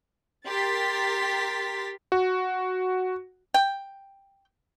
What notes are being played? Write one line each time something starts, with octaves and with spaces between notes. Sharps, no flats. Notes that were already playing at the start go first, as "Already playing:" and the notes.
G4 A#4 C6 A6 B6
F#4
G5